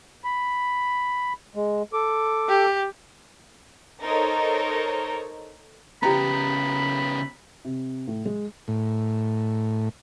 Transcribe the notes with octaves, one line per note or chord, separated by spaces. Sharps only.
B5
G#3
A4 D6
G4
D#4 A4 A#4 C5 C#5
C#3 B3 G4 A#5 B5
C3
A2
G#3
A2